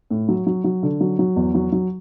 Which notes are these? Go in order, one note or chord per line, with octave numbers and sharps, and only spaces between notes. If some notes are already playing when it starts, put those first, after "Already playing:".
A2
F#3
F#3
F#3
D3
F#3
F#3
E2
F#3
F#3